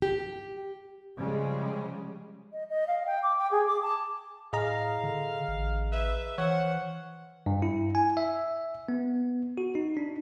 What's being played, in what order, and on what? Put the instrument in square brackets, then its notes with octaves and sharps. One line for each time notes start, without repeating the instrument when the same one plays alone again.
[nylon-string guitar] G4
[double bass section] C#3 F3 G3 G#3
[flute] D#5
D#5
F5
G5
D6
G5
G#4
D6
A5
[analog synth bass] A2 [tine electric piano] G#4 D#5 A#5 [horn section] F5
[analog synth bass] D3
A1
[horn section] B4 E5
[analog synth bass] E3 [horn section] C5 F5 F#5 [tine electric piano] C#5
[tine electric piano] G2
E4
G#5
E5
B3
F#4
D#4
D4